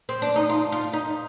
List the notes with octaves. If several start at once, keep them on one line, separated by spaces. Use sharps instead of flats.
C4
D4
D#4
F4
F4
D#4